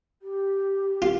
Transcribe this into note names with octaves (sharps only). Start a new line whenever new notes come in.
G4
F4